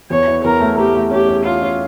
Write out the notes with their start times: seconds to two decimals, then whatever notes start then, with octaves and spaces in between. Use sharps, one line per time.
0.10 E2 C#5
0.27 E3
0.44 E2 A#4
0.60 A3
0.78 A3 G4
0.95 A3
1.11 C#4 G4
1.29 C#4
1.45 C#4 F4
1.62 C#4